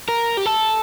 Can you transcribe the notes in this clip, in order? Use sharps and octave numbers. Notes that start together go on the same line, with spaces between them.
A#4
G4
A4